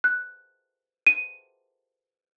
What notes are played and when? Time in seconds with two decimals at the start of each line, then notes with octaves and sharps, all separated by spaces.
0.04 F#6
1.07 D#7